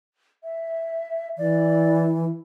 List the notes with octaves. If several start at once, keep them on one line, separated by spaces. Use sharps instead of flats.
E5
E3 D5